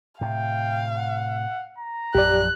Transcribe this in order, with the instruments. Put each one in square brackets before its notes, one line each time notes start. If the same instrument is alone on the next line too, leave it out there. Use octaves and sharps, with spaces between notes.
[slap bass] A2 C3 [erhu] F5 [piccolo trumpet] G5
[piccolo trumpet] F#5
A#5
[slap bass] A#1 F#2 F3 [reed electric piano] G4 D5 [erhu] F#6